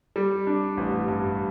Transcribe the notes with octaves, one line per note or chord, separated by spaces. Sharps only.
G3
D4
A1
G2